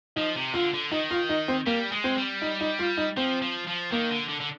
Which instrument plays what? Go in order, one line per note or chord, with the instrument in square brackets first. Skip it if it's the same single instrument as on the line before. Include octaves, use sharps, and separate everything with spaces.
[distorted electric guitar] F3 [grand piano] D#4
[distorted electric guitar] C3
[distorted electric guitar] D3 [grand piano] F4
[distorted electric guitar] D3
[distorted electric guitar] D#3 [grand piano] D#4
[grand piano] F4
D#4
C4
[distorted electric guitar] G3 [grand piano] A#3
[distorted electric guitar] G#3
[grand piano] C4
[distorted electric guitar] G3
[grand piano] D#4
D#4
F4
D#4
[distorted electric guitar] F3 [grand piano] C4
[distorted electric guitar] F3
F3
[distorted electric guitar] D#3 [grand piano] A#3
[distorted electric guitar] D3
D3
D3